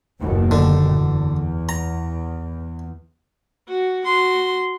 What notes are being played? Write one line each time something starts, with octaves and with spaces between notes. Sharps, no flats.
F#1 D#2 B2
D3
E2
A#5
F#4
F#4 C6